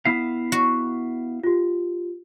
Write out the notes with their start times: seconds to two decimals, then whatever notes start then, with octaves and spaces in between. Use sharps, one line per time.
0.05 B3 E4 F5
0.52 F#4
1.44 F4 G4